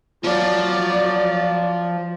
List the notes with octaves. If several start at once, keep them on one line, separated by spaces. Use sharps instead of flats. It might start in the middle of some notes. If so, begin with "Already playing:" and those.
F3 F#3 F4 D5